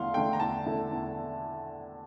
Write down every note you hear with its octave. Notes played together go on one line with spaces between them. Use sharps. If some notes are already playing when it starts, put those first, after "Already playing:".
Already playing: E2 D3 A3 E4 F5 C6
D3 A3 E4 A4 G5
A#5
E2 A5
D3 A3 E4 A4
E2